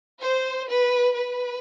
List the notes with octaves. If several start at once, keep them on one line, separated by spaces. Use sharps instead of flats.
C5
B4
B4